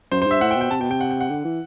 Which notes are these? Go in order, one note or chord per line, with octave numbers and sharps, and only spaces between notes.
F#2 C5
C5
G2 E5
A2 F#5
G5
B2
G5
C3 A5
B2 G5
C3 G5
F#5
G5
F#5
D3
E3